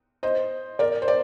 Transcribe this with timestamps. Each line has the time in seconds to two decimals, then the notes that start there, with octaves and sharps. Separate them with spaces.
0.23 C5 D#5
0.79 A#4 D5
1.02 C5
1.08 D5